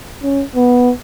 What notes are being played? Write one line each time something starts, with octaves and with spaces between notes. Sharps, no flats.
C#4
B3